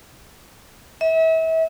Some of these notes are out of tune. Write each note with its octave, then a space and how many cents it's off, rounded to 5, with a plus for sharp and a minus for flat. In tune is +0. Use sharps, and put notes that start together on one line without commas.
E5 -35